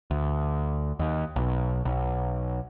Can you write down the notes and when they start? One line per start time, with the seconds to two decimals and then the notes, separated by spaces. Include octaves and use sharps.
0.11 D2
0.99 D#2
1.36 B1
1.85 B1